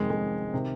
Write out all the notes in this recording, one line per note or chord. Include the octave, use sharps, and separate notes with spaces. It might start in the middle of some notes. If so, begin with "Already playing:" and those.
Already playing: F1 F2 D#3 G#3
G#3
C3 D#3